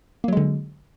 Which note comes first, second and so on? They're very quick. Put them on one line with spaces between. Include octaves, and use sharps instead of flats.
A#3 F#3 G#3 D3